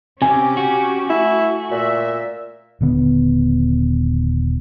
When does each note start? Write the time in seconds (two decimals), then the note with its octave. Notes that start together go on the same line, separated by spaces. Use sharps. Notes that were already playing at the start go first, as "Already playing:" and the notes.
0.22 C3 C#4 G4 G#5
0.57 F#4
1.10 A3 E4
1.71 A#2 E5
2.81 D#1 D3 B3